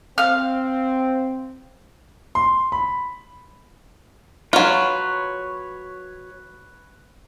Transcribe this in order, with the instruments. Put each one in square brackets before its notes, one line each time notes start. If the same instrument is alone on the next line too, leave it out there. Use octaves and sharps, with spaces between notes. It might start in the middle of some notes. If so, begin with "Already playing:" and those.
[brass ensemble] C4 [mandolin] F5 F6
[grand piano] C6
B5
[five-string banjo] F#3 F4 [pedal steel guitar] B4 C#5